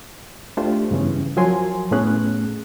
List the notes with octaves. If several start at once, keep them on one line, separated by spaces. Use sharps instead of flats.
A3 D4 F4 G4 C5
G2 C#3 E3 B3 C#4
F3 F#3 A#4 G#5 C6
A2 A3 B3 C#4 G#4 F#6